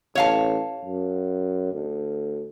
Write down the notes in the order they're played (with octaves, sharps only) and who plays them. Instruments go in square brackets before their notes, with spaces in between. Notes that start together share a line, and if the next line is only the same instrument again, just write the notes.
[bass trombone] A1 [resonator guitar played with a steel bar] C#5 F5 A5
[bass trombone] F#2
D2